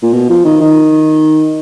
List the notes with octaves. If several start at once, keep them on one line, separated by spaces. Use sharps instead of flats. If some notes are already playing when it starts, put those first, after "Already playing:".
A#2
B2
F3
D#3
D#3